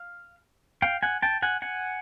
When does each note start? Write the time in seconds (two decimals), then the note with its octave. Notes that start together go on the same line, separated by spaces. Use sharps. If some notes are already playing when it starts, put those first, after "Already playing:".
Already playing: F5
0.82 F5 G5
1.03 F#5 G#5
1.22 G5 A5
1.42 F#5 G#5
1.62 F#5 G#5